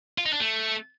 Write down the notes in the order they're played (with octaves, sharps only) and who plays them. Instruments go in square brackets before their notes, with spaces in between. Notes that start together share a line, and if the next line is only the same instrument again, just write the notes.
[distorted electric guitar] F4
D#4
D4
A3